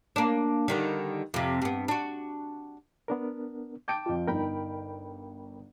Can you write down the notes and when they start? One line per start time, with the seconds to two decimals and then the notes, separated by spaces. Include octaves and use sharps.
0.16 A#3 D4
0.68 D3 D#3 G3
1.34 F2 C3
1.62 G2 B3
1.88 D4 F#4
3.08 B3 D4 A#4
3.88 G5 A5 D6 G6 D7
4.06 F2 F4
4.27 G1 D#4 A#4 G5 B5